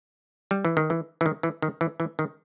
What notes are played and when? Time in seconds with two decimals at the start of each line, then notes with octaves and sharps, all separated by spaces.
0.51 G3
0.65 E3
0.77 D#3
0.90 E3
1.21 E3
1.26 D#3
1.43 E3
1.62 D#3
1.81 E3
2.00 E3
2.19 D#3